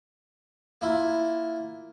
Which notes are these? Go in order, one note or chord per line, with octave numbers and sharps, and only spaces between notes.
A#3 E4 F4